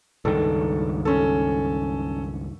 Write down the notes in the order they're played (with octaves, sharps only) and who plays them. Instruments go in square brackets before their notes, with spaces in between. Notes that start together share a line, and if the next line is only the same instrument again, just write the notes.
[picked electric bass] C#2 G2 D#3 [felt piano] A4
[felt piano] C#4 A4